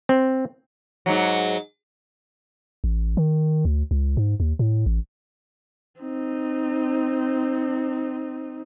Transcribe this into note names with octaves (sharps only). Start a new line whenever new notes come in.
C4
G#2 F#3
A1
D#3
D2
C#2
G#2
D#2
A2
A1
C4 D#4